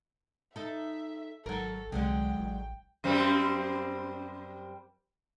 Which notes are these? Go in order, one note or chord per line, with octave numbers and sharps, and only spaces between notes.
D#4 A4 E5
G#1 F#3 A4 A#4
C2 D3 F#3 G#3 G5
A1
F#2 G3 C4